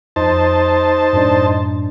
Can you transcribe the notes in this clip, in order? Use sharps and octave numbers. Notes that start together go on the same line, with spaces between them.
F2 D#4 C5 A5
F#2 A2 D4